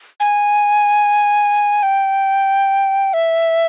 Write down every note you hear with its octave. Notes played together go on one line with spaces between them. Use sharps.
G#5
G5
E5